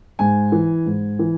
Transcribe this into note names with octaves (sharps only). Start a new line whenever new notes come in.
G#2 G#5
E3
G#2
E3